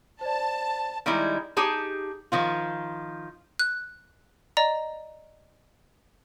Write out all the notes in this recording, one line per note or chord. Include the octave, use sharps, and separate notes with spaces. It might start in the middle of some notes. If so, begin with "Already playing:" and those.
C5 D5 A5
D#3 G3 G#3 D#4 E4
D#4 G4 G#4 A5
D#3 F3 F4
F#6
D5 D#5 A#5